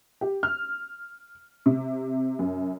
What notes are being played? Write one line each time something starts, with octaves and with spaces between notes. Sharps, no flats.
G4
F6
C3
F#2